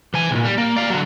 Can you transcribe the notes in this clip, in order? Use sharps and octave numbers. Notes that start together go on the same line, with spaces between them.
E3 G#5
B1 A#2
G3
A#3
D5 F5
D3 F#3